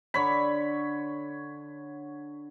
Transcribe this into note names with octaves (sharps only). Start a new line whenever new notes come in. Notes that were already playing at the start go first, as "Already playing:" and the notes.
D3 C#5 B5